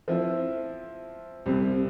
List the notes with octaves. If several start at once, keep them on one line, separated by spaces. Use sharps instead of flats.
F3 C4 E4
C2 C3 G3 C4